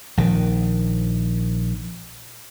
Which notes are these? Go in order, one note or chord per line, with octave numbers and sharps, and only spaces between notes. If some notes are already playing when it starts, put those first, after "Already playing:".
A#1 D#3